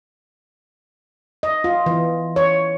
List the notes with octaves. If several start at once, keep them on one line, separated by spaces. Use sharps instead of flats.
D#5
F4
E3
C#5